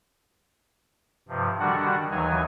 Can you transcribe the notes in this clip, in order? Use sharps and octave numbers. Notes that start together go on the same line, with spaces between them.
G2 C3 F3
D3 D#3 G3 D4 F#4 F#5
D#2 E3 F#3 D#4 G#5